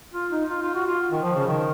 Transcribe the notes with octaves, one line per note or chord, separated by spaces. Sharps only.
F4
D#4
F4
F4
F#4
F4
D#3
F3
C#3
D#3